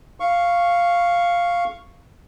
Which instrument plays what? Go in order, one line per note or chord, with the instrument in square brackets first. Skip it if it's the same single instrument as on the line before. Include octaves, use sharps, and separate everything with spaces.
[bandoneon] F5 C#6